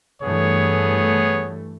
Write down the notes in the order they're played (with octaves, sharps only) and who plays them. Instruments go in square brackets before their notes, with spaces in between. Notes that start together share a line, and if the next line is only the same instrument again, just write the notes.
[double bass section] G2 E3 A3 [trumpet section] B3 G#4 C#5